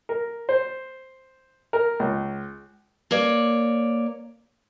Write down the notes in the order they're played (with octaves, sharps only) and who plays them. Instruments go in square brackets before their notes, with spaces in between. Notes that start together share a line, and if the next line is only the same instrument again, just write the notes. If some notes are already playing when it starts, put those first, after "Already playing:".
[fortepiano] A#4
C5
A#4
C#2
[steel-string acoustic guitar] A#3 C#5 D5